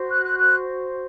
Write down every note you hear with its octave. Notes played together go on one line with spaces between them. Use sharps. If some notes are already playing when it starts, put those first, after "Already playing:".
Already playing: F#4 C5
F#6
F#6
F#6